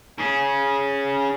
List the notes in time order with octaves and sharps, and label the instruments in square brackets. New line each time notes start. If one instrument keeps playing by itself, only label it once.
[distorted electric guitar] C#4 G#4